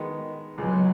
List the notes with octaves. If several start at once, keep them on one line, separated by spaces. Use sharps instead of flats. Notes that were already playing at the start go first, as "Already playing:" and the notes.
Already playing: D#3 G#3 B3
C#2 B2 F#3 G#3